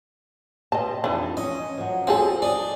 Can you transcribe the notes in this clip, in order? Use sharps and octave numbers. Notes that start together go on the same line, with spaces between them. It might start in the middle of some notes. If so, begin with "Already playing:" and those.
B2 C4 D#5 A5
F2 E3 D4 D#4
C#4 D#5
F3 F#3
F3 C4 C#4 F#4 G#4 A4
D4 D#5